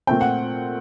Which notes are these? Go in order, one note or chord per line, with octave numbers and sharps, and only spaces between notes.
A#2 A3 C4 G5
F#5